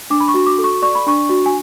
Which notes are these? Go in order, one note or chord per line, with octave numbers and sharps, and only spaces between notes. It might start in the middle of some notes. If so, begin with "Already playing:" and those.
D4 D6
B5
C#6
F#4
D6
A4
C#6
D5 C#6
B5
D4 C#6
F#4
G#5